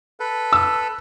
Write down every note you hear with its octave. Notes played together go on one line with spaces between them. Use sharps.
A4 B4
E6